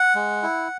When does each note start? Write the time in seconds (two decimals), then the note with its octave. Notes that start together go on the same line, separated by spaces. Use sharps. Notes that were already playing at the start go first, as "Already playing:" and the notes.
Already playing: F#5
0.15 G#3
0.43 E4